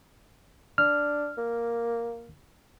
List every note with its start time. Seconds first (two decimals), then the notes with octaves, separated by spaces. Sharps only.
0.78 D4 F6
1.38 A#3